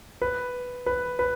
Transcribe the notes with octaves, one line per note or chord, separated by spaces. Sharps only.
B4
B4
B4